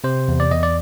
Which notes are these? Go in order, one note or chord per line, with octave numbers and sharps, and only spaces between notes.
C3 C5
E2
D5
E2 D#5
D5